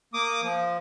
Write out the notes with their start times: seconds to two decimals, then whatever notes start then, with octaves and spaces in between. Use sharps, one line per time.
0.14 A#3 D6 D#6
0.42 F3